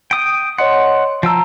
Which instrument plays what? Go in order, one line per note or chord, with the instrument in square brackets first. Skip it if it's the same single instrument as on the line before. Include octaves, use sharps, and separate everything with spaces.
[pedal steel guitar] G5 D#6
[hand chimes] C#5 D#5 C6 [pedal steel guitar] F#5
[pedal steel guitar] F3 G5 E6 [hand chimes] A5 A#5